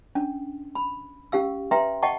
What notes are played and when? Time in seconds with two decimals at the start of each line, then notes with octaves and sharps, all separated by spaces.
0.15 C#4 D4
0.75 B5
1.32 C#4 G4 F5 E6
1.71 B4 E5 G5 A#5 C6
2.03 D#5 F#5 G5 A5 C#6